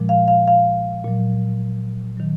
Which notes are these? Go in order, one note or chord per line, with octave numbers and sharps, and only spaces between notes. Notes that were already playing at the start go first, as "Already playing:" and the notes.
Already playing: A#2 F3 G#3
F5
F5
F5
A#2 F#3
D#3 F#3